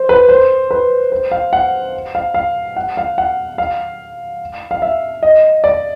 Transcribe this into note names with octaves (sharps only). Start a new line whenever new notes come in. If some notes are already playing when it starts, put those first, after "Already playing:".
Already playing: C5
B4
C5
B4
C5
F5
F#5
F5
F5
F#5
F5
F#5
F5
F5
E5
D#5
D5